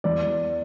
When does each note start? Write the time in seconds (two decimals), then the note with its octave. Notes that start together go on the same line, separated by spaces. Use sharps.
0.04 E2 D5